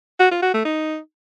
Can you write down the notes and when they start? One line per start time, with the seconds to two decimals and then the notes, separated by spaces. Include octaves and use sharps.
0.20 F#4
0.31 F4
0.43 F#4
0.54 A3
0.65 D#4